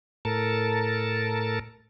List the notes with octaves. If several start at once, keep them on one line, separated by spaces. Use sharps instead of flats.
A2 A4 A#4 A5